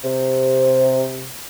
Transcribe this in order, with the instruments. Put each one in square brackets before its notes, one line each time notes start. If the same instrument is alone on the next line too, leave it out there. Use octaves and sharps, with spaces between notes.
[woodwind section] C3